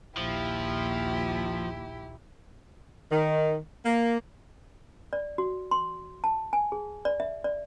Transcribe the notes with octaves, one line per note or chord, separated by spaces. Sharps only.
A#1 D#2 F3 E4 G4
D#3
A#3
D5
F#4
C6
A5
G#5
G#4
D5
E5
D5